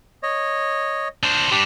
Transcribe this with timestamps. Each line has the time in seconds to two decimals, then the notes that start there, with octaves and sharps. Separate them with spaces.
0.23 C#5 D#5
1.23 D4 C5
1.51 G3 D4 G4